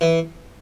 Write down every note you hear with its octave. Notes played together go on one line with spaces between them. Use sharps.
E3